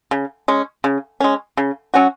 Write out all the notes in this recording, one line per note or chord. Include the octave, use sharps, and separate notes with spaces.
C#3
G#3 C#4
C#3
G#3 C#4
C#3
F#3 C#4 F#4